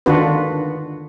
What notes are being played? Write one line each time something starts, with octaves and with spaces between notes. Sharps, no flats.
D3 D#3 D4 F4 F#4 B4